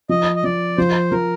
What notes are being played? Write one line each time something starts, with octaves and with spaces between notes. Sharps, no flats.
F3 D#5
D#5
F3 D5
F3 C5
F3 A#4